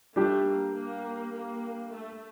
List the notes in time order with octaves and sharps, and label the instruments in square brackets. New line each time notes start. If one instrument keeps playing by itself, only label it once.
[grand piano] G3 D4 G4 [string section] A3
[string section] A#3
A#3
A#3
A3